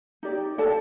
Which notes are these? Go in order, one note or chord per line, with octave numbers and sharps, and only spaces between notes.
D#4 G4 D5
A4 D5 A5